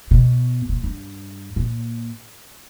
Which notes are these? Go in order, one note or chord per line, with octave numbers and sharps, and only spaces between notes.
B2
A#2
G2
A#2